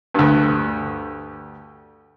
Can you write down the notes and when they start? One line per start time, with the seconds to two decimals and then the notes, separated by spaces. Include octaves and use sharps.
0.14 D2 G2